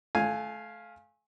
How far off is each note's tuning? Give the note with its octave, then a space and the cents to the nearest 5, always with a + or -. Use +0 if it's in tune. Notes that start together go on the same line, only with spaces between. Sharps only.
A3 -30 F5 +0 G#5 +0